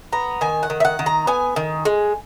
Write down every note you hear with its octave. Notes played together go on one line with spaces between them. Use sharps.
B3 A#5
D#3 G#5
F#5
D#3
E5
F#5
D#3
A#5
B3 G#5
D#3
G#3